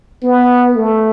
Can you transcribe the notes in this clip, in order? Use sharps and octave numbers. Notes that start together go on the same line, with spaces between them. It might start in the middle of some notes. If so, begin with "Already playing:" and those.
B3
A3